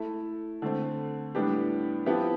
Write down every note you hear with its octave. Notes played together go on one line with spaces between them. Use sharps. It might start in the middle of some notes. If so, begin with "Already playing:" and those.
Already playing: A3 E4 A4
D3 A3 C4
A2 G3 B3 D4 G4
F3 B3 E4 G4